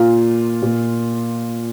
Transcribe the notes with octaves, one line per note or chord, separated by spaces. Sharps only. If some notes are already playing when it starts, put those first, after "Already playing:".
Already playing: A#2 F4
A#2